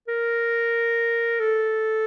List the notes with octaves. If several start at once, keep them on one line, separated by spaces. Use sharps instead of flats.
A#4
A4